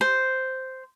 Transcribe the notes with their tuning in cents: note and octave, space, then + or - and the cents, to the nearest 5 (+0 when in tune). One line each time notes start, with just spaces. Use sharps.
C5 -5